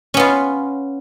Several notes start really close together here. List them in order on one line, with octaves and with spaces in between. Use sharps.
C#4 B3 F4